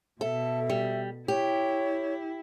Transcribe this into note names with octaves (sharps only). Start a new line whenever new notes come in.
B2 A4 E5
G3
E4 G4 C#5